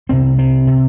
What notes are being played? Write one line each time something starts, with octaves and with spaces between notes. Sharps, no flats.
C2 C3 C4
C4
C3